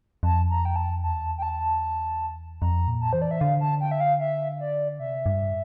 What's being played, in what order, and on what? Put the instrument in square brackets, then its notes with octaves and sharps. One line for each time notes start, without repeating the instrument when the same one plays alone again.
[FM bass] F2 [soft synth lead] A5
[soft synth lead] A#5
G5
A5
[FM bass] E2 [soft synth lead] A5
[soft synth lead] G5
A5
[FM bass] F2 [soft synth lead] A#5
[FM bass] A#2
[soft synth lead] A5
[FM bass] E3 [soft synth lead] C5
[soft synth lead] D5
E5
[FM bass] D3 [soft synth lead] F5
[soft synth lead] A5
G5
E5
F5
E5
D5
[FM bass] C3 [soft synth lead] E5
[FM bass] G2